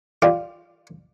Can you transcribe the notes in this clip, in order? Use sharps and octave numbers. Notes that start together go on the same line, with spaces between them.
F4 G4 D5